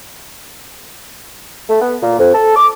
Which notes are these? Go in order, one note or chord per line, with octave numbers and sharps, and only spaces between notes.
A3
B3
A#2
F2
A4
D6